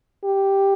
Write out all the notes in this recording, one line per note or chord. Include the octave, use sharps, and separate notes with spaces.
G4